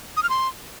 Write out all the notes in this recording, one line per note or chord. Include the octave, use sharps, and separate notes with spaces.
D#6
F6
C6